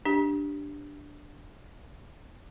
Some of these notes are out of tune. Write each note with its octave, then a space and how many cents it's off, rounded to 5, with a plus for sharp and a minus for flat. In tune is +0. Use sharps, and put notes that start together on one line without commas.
D4 +0 G4 +0